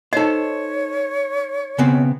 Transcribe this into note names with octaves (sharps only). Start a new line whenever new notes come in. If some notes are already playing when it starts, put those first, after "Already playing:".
D#4 A4 C5 C#5 D#5
C#3 B3 C4